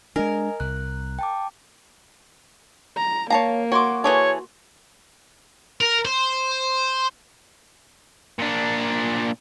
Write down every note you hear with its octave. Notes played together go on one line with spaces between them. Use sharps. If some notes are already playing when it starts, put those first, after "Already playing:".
G#3 D4 A#4 D#5 G#5
C2 F#6
G5 A5 D6
A#5
A#3 C#5 F5 A5 A#5
F#4 C#5 C6 D6
E3 G#4 A4 C#5
A#4
C5
A#2 D4